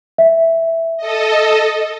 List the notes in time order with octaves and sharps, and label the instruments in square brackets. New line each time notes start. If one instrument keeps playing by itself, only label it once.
[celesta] E5
[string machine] A4 D#5